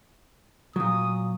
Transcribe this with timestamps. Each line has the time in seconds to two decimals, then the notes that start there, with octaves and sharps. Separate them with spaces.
0.76 A#2 F#3 D#6